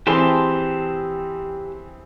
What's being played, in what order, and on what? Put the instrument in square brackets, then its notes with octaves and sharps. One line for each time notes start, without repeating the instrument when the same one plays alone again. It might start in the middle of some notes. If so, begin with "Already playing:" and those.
[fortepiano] E3 C4 G#4 [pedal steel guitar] G4 A5 C6